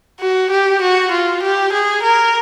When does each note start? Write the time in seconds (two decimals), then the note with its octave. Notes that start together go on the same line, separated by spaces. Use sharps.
0.20 F#4
0.50 G4
0.81 F#4
1.11 F4
1.42 G4
1.73 G#4
2.03 A#4